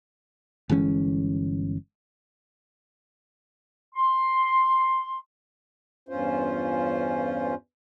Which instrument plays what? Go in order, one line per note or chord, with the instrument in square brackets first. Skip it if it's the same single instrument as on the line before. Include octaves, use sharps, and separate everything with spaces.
[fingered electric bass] G1 E3 G#3 C#4
[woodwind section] C6
[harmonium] E2 G2 C#4 F4 C5